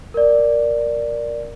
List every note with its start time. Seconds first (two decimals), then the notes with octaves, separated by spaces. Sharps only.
0.14 A#4 D5